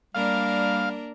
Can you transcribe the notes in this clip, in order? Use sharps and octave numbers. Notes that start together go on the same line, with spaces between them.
G3 A#3 D4 A#4 F5